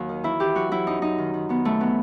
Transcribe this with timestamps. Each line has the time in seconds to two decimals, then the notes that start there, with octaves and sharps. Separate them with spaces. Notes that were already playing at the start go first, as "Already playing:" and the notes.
Already playing: D#2 F#3 F#4
0.09 D#3
0.23 E3 E4
0.40 E3 G4
0.55 F#3 F#4
0.71 F#3 E4
0.87 F#2 D#4
1.02 F#2 D#4
1.18 D#3
1.34 D#3
1.49 D#3 B3
1.65 F#2 A3
1.80 E3 B3